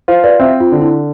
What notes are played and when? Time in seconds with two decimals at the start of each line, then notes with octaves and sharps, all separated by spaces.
0.08 F4 C5
0.24 B4 D5
0.40 C4 C5 E5
0.60 F4
0.72 D3
0.81 E4